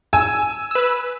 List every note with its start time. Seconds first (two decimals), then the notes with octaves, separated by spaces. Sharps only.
0.13 G#5 E6
0.71 B4 E6